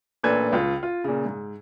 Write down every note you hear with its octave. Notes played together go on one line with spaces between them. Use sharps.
A1 A#2 D4 A4 B4 G#6
C#2 F4
F4
A#2 C#3
G#2